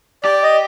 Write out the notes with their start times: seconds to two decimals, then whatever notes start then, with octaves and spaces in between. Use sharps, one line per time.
0.24 G4 D5
0.43 D#5